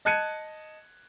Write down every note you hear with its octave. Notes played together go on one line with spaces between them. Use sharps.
D#5 A5 F#6 G#6 C#7 D#7